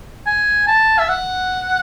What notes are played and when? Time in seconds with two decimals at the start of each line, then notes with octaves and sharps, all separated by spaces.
0.26 G#5
0.67 A5
0.99 E5
1.09 F#5